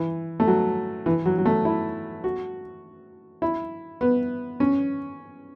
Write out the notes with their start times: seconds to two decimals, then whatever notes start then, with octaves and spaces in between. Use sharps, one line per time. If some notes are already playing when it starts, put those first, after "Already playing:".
Already playing: E3
0.40 A3
0.47 F#3
1.06 E3
1.26 F#3
1.38 F#3
1.46 A3
1.65 E4
2.24 F#4
3.42 E4
4.01 B3
4.60 C#4